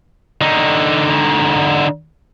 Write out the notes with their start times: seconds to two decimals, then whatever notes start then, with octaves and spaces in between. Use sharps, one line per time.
0.41 D3 D#4